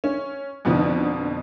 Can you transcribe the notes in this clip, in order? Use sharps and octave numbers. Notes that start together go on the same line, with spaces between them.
C#4
F2 B2 D3 F3 D4 D#4